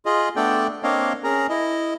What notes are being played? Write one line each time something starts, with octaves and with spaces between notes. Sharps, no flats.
F4 G#4 D#5
A3 B3 D4 A4 D5 G5
A#3 C4 D4 C#5 D#5 F5
C#4 G#4 A#4 A#5
E4 D#5